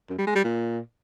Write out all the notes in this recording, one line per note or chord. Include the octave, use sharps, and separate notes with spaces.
F#2
G3
G#3
G3
A#2